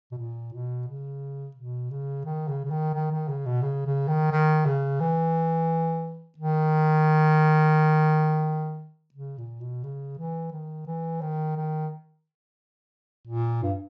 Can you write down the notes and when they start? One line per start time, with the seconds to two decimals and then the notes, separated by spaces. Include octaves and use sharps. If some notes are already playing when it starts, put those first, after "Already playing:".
0.12 B2
0.18 A#2
0.53 B2
0.88 C#3
1.57 B2
1.91 C#3
2.25 D#3
2.48 C#3
2.64 C#3
2.70 D#3
2.94 D#3
3.12 D#3
3.28 C#3
3.46 B2
3.62 C#3
3.86 C#3
4.08 D#3
4.31 D#3
4.66 C#3
5.00 E3
6.38 D#3
9.14 C#3
9.38 A#2
9.61 B2
9.84 C#3
10.18 E3
10.52 D#3
10.87 E3
11.21 D#3
11.56 D#3
13.27 A#2
13.63 G2